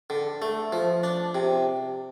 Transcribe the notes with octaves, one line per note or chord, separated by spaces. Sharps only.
D3
A3
F3
D4
C3